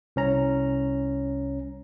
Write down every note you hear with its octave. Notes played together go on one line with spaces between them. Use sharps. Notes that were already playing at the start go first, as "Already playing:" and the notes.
C2 C#4 A#5